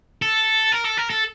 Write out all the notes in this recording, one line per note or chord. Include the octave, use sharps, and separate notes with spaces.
A4
A#4
A4
A#4
A4